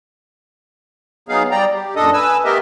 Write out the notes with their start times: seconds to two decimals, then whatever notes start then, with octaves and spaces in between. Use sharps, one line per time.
1.29 F#3 B3 D#4 G#4 F5
1.51 G3 D5 G5 A#5
1.73 G4
1.96 F#2 A#2 D4 A4 D#5 D#6
2.13 B4 G#5 E6
2.45 A3 B3 G4 A#4 D#5 E5